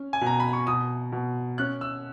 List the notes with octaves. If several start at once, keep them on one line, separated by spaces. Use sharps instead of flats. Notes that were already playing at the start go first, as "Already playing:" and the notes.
Already playing: C#4
G#5
B2
A#5
B5
C#6
B2 D#6
B2
C#4 F#6
E6